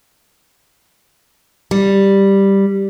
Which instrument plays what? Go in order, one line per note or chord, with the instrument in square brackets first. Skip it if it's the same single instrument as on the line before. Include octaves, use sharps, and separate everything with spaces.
[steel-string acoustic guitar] G3